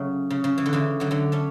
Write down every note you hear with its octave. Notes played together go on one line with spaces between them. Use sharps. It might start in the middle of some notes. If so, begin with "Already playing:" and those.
Already playing: C#3 F#3 A3
C#3
C#3
E3
D3
C#3 E3
D3 F#3
D3 F#3
A3 C#4